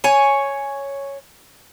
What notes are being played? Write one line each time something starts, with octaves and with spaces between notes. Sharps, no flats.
C#5 G#5